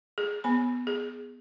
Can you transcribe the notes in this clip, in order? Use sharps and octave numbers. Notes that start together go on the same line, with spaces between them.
G#4
B3 B5
G#4